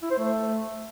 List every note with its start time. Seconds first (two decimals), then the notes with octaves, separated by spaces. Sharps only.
0.02 E4
0.11 C5
0.19 A3